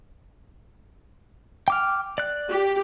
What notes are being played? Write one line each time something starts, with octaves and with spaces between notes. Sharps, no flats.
G5 D6 F6
D5 F#6
G4